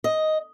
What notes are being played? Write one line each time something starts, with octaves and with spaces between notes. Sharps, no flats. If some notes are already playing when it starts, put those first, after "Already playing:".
D#5